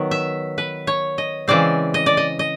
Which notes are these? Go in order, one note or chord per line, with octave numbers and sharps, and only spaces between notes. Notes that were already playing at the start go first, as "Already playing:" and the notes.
Already playing: D#3 F#3 B3
E5
B4
C#5
D#5
C#3 E3 G#3 C4 D5
D#5
D5
D#5
D#5